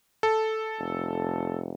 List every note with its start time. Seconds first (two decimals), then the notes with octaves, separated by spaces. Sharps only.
0.23 A4
0.79 F1